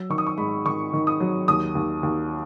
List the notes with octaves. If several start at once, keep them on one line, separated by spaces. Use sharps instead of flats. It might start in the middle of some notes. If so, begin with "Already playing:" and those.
Already playing: F#3 E6
D#3 C#6
D#6
C#6
G#2 B5
D#3 C#6
D#3
D#6
F#3
D#2 D#6
D#2
D#2